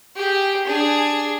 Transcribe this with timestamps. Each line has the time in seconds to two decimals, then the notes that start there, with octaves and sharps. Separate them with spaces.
0.16 G4 G#4
0.65 D4 G#4